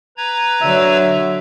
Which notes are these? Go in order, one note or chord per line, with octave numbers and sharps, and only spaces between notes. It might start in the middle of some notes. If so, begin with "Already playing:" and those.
B4 A#5 G#6
D3 F#3 E5